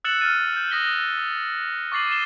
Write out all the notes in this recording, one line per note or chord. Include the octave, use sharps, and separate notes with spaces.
E6 F#6 A6 C#7 E7 F#7
F6 F#6 A6 D#7
G6
D#6 A#6 B6 G7
C#6 D6 A6 C7 F#7
A6 E7 G7